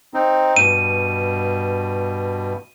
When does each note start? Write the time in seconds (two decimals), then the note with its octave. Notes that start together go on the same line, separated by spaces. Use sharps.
0.14 C4 D#4
0.56 G2 B2 D#7